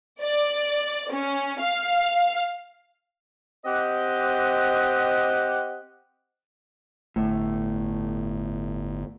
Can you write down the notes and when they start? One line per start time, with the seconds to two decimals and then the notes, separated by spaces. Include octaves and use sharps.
0.22 D5
1.11 C#4
1.59 F5
3.65 C4 G4 D#5 F#5
7.16 G1 A2